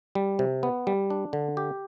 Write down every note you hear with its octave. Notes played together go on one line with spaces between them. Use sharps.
G3
C3
B3
G3
D4
D3
G4